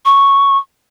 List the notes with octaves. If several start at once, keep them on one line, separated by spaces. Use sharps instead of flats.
C#6